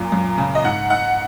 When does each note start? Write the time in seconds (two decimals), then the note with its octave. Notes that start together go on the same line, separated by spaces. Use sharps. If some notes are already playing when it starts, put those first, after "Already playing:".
Already playing: F#2 A#2
0.12 F#2
0.38 C#3
0.55 D#5
0.64 G#2 F#5
0.90 D#4 F#5